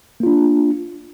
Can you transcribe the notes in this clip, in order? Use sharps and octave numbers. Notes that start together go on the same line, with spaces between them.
A#3 D4 F4